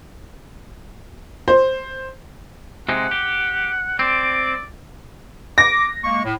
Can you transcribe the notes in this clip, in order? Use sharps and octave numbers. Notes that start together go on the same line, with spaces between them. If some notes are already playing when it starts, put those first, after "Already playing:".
C5
C3 G#3 D#4 F#5
G4
C4 D5
D6 A#6
G#3 A#3 C#6
A2